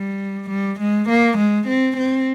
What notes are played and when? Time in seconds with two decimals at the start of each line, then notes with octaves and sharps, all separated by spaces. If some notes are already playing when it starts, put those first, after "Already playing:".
Already playing: G3
0.50 G3
0.80 G#3
1.09 A#3
1.38 G#3
1.68 C4
1.97 C4